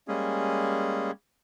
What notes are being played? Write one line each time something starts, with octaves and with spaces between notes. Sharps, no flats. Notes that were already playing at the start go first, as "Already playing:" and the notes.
G3 G#3 A#3 C#4 G#4